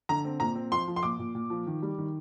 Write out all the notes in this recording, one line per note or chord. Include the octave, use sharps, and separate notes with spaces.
D3 A#5
C4
A#2 A#5
C4
F3 C6
F3
C6
A#2 D6
A#2
A#2
F3
D#3
G3
D#3